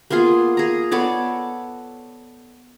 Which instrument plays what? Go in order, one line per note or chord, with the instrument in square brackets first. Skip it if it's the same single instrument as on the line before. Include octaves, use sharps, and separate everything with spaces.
[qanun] A#3 B3 F4 G#4
G#4 A#5
B3 A4 C#5 D5